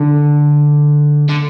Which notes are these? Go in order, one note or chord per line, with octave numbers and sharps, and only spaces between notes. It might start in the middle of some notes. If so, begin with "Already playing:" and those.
Already playing: D3
D3